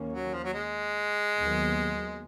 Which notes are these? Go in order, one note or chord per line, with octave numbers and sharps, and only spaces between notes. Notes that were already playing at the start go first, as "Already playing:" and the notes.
Already playing: D#2 D#3 A#3 C#4
F#3
F3
F#3
G#3
D#2 D#3 F#3 B3